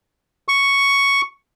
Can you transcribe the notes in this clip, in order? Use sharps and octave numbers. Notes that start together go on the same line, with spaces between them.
C#6